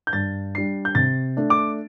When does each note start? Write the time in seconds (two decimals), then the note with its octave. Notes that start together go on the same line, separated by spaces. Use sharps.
0.07 G6
0.13 G2 A6
0.55 G3 D4 C7
0.85 G6
0.95 C3 A6
1.37 A3 D4
1.50 D6